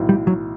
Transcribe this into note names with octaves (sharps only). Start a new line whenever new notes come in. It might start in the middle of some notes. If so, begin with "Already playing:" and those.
Already playing: B1 A2 E3
G3
F#3